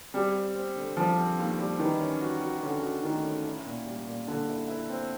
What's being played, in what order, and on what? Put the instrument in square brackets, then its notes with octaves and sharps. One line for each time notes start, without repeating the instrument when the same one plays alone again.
[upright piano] G3 [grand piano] C4
[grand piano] C4
C4
D3
[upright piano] F3 [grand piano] G3
[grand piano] C4
D#2
G3
[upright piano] D#3 [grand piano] E3
[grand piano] C#4
F#4
F#4
[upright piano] D3 [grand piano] C#4
[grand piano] F#4
[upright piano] D#3 [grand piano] A3
[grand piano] C#4
E4
A#2
G3
A#2
[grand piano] A#2 [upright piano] D3
[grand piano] E4
E4
C4